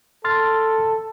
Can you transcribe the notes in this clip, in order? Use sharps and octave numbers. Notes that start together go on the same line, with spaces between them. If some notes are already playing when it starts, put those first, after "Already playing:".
A4 C6 F6 A6